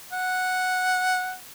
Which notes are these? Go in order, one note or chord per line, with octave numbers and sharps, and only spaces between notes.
F#5